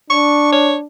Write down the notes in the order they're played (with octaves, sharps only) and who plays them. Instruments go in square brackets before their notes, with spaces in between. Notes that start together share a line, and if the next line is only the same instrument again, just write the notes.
[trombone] D4 [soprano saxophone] C#6
[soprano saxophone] C#5